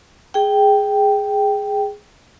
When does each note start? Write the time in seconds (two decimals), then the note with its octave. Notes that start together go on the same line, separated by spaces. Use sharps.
0.34 G#4 G5